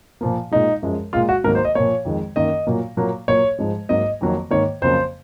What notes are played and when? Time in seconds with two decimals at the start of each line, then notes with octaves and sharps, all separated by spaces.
0.21 A#2 F3 A#3
0.51 A#2 G#3 D#4
0.83 F#2 F3 G#3
1.13 A#2 G#3 F4
1.29 F#4
1.44 G#2 D#3 F#3 A#3 A#4
1.55 C5
1.65 D#5
1.75 A#2 F3 A#3 C#5
2.05 F2 D#3 G#3
2.36 F#2 D#3 A#3 D#5
2.67 A#2 F#3 A#3
2.97 A#2 F#3 A#3
3.28 A#2 F#3 A#3 C#5
3.59 G#2 F3 G#3
3.89 G#2 F#3 A#3 D#5
4.21 F2 D#3 F#3 A#3
4.51 G#2 D#3 A#3 C#5
4.82 F2 C#3 F#3 A#3 C5